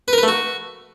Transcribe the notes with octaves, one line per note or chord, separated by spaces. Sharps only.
B4
A#4
B4
A3
F#4